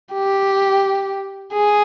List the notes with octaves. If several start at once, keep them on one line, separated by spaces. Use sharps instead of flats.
G4
G#4